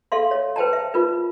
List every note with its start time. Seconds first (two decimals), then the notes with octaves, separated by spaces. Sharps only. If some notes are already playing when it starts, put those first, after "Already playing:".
0.12 A4 E5 F5 C6
0.31 C#5
0.56 B4 C5 G5 A5 A#5
0.73 E5
0.94 F4 A#4 B4